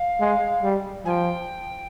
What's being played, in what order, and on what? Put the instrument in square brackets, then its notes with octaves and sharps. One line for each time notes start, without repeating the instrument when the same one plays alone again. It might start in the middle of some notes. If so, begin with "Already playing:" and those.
Already playing: [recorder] F5
[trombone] G#3
G3
[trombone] F3 [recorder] G5 G#5